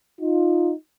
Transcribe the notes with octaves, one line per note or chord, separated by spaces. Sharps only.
D#4 F4